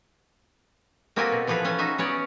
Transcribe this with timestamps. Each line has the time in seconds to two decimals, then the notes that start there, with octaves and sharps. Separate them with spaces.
1.16 A#3 C4 F#4 G4 A4 G#5
1.32 B2
1.47 E3 F3 G#4 A4 B4
1.64 C#4 A4 G#5
1.78 D#4 F#4 E5 G#5
1.98 B3 C#4 C#5 D5